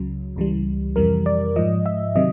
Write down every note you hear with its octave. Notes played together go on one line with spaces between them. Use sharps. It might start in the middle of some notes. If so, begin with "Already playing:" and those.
Already playing: C#2 C#3 F#3
C#2 C#3 E3 G3
F2 C3 E3 G3 A#4
D5
G#2 F3 D#5
E5
C3 D#3 F#3 D#5